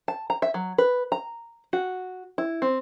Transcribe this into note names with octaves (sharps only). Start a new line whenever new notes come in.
A5
A#5
E5
F#3
B4
A#5
F#4
E4
C4